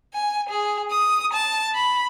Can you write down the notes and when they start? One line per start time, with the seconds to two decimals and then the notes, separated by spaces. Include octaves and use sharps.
0.12 G#5
0.48 G#4
0.90 D#6
1.31 A5
1.74 B5